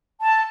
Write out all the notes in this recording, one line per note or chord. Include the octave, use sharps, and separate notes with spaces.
A5